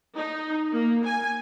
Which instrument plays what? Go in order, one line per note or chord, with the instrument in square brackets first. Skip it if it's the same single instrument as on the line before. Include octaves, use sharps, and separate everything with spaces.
[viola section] D#4
A#3
G#5